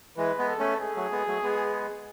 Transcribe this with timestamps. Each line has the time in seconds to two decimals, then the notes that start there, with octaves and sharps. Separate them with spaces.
0.17 E3 G#3 B4
0.38 G#3 B3
0.48 A4
0.59 A3 C#4
0.81 G#4
0.96 F#3 A3
1.12 G#3 B3
1.27 F#3 A3
1.43 G#3 B3